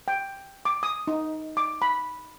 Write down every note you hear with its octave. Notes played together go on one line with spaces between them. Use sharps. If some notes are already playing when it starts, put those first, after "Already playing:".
G5
D6
D#6
D#4
D6
B5